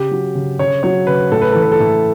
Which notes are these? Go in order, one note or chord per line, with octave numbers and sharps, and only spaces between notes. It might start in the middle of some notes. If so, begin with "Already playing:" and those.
Already playing: C#3 G4
F#3
C#3
C#3 C#5
F#3 C#5
C#3 B4
A2 A4
B4
E3 A4
B4
A4
A2